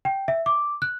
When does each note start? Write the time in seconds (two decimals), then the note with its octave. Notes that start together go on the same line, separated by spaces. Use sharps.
0.05 G5
0.28 E5
0.46 D6
0.82 F#6